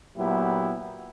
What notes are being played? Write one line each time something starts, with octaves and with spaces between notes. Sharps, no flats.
A#2 F#3 B3 E4 G4